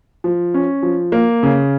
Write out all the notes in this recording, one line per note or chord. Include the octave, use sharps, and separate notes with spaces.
F3
C#4
F3
A#3
C#3